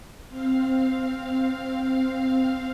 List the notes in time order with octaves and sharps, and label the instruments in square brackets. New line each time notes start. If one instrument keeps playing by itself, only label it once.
[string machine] C4 F5